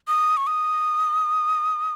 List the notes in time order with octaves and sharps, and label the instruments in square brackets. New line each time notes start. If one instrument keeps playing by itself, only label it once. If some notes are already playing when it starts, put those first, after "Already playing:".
[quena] D#6
C#6
D#6